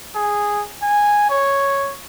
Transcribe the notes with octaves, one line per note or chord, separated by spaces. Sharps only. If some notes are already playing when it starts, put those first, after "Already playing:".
G#4
G#5
C#5